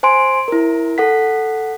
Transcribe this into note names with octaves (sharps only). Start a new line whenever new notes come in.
C5 G#5 C6 D7
E4 A#4
A4 F#5 B6